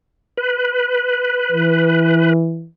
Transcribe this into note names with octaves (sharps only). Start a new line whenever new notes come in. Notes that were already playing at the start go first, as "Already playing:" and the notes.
B4
E3